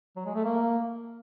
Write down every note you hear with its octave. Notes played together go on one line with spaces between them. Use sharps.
F#3
G#3
A3
A#3